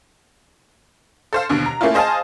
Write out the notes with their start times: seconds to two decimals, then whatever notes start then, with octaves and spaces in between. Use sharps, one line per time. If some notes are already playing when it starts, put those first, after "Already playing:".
1.33 A4 C5 F5
1.49 D#2 B2 D3
1.66 A#5
1.81 A3 A#3 C#4 E4 F4
1.94 G#4 C5 D#5 F5 G#5 A5